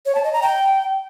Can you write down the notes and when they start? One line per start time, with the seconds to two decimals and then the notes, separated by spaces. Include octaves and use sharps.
0.06 C#5
0.15 A5
0.24 D#5
0.33 A#5
0.42 G5